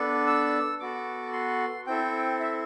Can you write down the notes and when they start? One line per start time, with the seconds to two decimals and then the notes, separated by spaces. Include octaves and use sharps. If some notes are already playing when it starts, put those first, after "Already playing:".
Already playing: B3 D4 A4
0.27 E6
0.80 B3 F#4 A4 D6
1.33 C6
1.87 C4 E4 A4 G5
2.40 E5